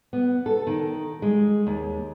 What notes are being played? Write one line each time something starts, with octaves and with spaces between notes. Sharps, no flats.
B3
A4
D#3
G#3
D#2